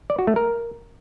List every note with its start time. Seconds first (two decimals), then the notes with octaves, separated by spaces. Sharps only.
0.10 D5
0.19 F#4
0.27 A3
0.36 A#4